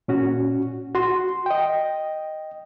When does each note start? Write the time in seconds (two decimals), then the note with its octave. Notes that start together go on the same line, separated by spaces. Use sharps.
0.08 A#2 C#4 F#4
0.95 F#4 C6
1.46 D#5 G5